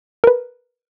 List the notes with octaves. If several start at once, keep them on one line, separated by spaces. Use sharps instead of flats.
A#4 B4